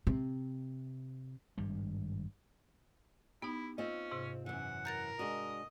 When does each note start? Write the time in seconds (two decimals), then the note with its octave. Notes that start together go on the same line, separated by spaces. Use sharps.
0.07 C3
1.58 G#1 G2 G3
3.42 B3 D#4 E4 G4
3.78 C4 C#4 F4 D#5
4.11 G#2 C3
4.46 F#2 E3 F#5
4.85 A#4 G6 A6 A#6
5.19 G#3 D4 F#4 D#5